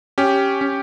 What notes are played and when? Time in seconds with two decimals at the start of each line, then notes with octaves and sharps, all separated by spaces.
0.18 C#4 G4
0.61 C#4